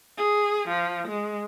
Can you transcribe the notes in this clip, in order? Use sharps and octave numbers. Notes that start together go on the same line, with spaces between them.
G#4
F3
G#3